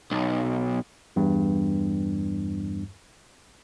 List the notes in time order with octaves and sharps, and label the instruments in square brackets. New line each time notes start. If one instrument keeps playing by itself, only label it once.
[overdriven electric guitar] B1
[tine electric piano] E2 G2